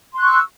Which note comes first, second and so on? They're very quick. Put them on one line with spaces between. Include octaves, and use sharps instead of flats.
C6 F#6 C#6 E6